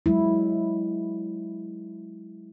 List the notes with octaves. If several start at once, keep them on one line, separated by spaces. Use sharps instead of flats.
F#3 G#3 E4